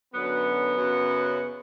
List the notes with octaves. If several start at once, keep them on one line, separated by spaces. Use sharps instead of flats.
F#2 D3 F#3 B3
F#2 C#3 F#3